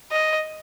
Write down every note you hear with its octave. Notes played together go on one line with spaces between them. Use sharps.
D#5